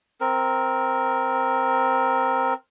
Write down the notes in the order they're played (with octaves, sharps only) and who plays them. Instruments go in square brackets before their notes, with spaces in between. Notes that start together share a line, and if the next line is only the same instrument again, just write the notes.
[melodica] C4 A#4